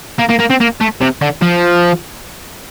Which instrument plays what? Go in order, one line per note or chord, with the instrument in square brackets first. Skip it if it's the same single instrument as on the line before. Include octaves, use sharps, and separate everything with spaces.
[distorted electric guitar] A#3
A#3
A#3
C4
A#3
A3
C3
D3
F3